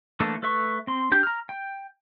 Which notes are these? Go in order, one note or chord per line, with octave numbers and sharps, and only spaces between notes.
E3 A3 A#3 D4 A4
A3 A4 B4 E5 C#6
C4 C6
D4 G4 G5 G6
A#5 F6
G5